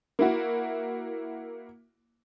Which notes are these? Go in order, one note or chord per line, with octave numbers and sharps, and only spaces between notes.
A#3 E4 F#4